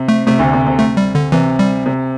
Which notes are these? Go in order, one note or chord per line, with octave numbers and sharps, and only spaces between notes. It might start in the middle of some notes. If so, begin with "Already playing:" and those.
Already playing: C3
A3
C3 A3
D2 D3
C3
C3
A3
G3
D3
C3 E3
G3
C3